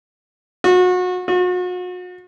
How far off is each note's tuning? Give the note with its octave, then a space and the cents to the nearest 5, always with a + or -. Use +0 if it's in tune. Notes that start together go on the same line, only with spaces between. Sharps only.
F#4 -30
F#4 -40